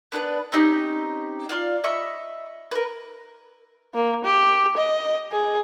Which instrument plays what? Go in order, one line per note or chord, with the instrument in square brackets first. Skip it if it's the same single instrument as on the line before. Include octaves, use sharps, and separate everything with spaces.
[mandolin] B3 D4 A#4 B4
C4 C#4 D#4 G4
F4 D5 F5
D#5 E5 B5 C#6
A#4 B4
[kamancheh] A#3
G4
D#5
G#4